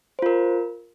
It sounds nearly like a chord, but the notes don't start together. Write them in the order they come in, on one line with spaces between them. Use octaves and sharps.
C5 F4 A#4